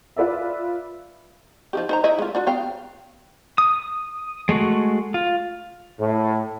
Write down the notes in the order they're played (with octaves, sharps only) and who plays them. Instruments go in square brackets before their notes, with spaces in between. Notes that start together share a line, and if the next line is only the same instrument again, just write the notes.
[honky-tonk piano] F4 B4 D5 E5
[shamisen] F3 D#4 G4
D#4 C5 A#5
E4 D#5
G#3 F4
D4 F4 F#4
B3 F5 G5
[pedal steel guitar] D#6
G#3 A3 F#4
F4
[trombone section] A2